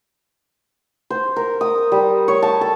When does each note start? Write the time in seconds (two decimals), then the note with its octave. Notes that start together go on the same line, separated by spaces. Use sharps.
1.10 C5
1.36 A#4
1.61 D#6
1.92 G3
2.28 C#5
2.42 A5
2.61 A4